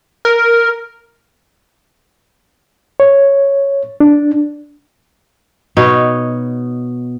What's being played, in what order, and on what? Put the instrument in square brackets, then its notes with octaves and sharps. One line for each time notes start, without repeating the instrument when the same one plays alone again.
[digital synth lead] A#4
[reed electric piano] C#5
D4
[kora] B2 D#4 C#5